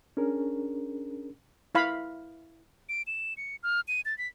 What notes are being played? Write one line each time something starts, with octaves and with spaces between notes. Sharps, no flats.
C#4 D4 G#4 A#4
E4 F5 B5
D7
E7
C#7
F6
D#7
A6
B6